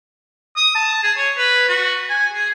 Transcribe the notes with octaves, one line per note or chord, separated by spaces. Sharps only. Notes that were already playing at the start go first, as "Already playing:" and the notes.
D#6
A5
G#4
C#5
B4
F#4
G#5
G#4